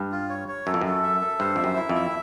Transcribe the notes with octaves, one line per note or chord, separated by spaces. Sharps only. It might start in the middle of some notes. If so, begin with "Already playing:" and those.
Already playing: G2
F4
C#5
C#5
F#2 A4
F2
F#2 A4
E5
A4
G2 C5
F2 E5
F#2
E4
F2
E5